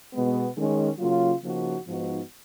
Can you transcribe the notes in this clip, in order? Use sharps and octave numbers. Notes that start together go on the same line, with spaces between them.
B2 G#3 B3
D#3 G#3 C#4
C#3 F#3 A#3 F4
C#3 F3 A#3 D#4 F#4
G#2 F3 B3 D#4 F#4